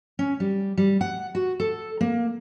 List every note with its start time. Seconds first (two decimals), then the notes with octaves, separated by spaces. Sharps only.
0.19 C#4
0.40 G3
0.77 G3
1.01 F#5
1.35 F#4
1.60 A4
2.01 A#3